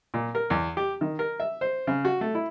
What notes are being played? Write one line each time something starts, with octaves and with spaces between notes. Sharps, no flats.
A#2
A#4
E2
G4
D#3
A#4
E5
C5
C#3
F#4
A3
E4